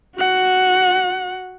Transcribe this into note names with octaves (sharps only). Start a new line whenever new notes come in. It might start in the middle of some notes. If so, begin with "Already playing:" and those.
F#4 F#5